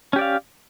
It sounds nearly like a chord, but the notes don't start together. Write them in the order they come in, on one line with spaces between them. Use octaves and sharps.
C#4 G4 D5 F5